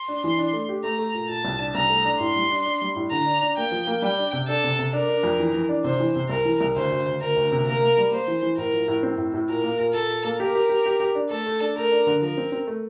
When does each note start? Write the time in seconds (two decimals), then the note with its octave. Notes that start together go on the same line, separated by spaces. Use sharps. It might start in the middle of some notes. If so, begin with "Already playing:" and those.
Already playing: C6
0.08 D4
0.24 E3
0.39 D4
0.53 A3
0.69 G4
0.84 A3 A#5
0.99 A3
1.14 A#2
1.29 A#2 A5
1.45 C2
1.59 D4
1.75 C2 A#5
1.90 A3
2.05 D4
2.20 A2 C6
2.36 G3
2.51 D4
2.66 D4
2.82 G3
2.96 A2
3.12 D3 A#5
3.26 D4
3.41 D4
3.57 A#3 G5
3.72 F3
3.87 A#3
4.02 G3 G5
4.18 D4
4.33 C3
4.48 D4 A4
4.64 C3
4.79 C3
4.93 D4 A#4
5.09 D4
5.23 F2
5.40 E3
5.54 E3
5.69 D4
5.84 C3 C5
6.00 E3
6.16 C3
6.29 C2 A#4
6.45 E3
6.61 C2
6.76 D2 C5
6.91 D2
7.06 D2
7.21 D2 A#4
7.36 D2
7.52 C3
7.66 A#3 A#4
7.82 A#3
7.98 G3
8.12 A#3 C5
8.28 E3
8.43 E3
8.58 A2 A#4
8.73 F3
8.88 A2
9.03 C4
9.18 A2
9.34 A2
9.49 A#2 A#4
9.64 A#3
9.80 A#2
9.94 A#2 A4
10.09 A#2
10.25 A#3
10.39 G4 A#4
10.55 G4
10.69 G4
10.86 G4
11.00 G4
11.15 D4
11.31 A3 A4
11.46 A3
11.61 D4
11.76 A3 A#4
11.92 D4
12.07 D3
12.22 F3 A#4
12.37 C4
12.52 C4
12.67 A3